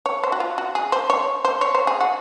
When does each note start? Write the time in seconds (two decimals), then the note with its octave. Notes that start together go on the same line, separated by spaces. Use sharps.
0.06 C#5
0.24 C5
0.32 F#4
0.40 F4
0.58 F#4
0.75 G#4
0.92 C5
1.10 C#5
1.45 C5
1.61 C#5
1.75 C5
1.87 G#4
2.01 F#4